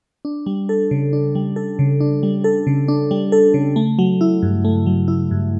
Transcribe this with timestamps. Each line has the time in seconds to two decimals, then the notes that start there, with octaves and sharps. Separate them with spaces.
0.25 D4
0.46 G3
0.69 A4
0.91 C#3
1.13 D4
1.35 G3
1.56 A4
1.79 C#3
2.00 D4
2.23 G3
2.44 A4
2.67 C#3
2.88 D4
3.11 G3
3.32 A4
3.54 C#3
3.76 A3
3.99 F#3
4.21 E4
4.43 G2
4.65 A3
4.86 F#3
5.08 E4
5.31 G2